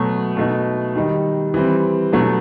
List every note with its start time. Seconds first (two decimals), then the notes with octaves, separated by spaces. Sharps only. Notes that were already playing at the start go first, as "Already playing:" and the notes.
Already playing: B2 F#3 A3
0.37 B2 A3 D#4
0.96 D#3 G3 D#4
1.54 E3 G3 C4
2.13 B2 F#3 A3